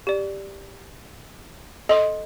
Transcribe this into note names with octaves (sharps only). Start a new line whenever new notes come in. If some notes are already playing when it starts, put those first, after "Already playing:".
G4 D5
A4 D#5 C6 D#6